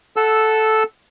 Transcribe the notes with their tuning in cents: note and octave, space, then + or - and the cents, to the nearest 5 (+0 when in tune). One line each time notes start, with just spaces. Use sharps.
A4 -5 F#5 +0 E6 +0